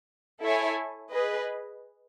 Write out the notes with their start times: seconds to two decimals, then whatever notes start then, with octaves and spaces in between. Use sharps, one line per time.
0.43 E4 A4 C#5 E5 G#5
1.12 G#4 B4 D#5